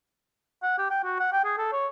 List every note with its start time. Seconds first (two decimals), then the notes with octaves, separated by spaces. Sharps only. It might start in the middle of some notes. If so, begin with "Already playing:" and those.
0.63 F#5
0.78 G4
0.91 G5
1.04 F#4
1.20 F#5
1.33 G5
1.45 G#4
1.58 A4
1.73 C#5